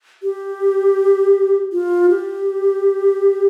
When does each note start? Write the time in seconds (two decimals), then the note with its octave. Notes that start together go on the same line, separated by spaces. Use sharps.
0.23 G4
1.73 F4
2.10 G4